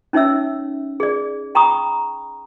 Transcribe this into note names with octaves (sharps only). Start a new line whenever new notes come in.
C#4 D#4 C#5 E5 E6
G#4 D5
G5 A#5 B5 C#6 D#6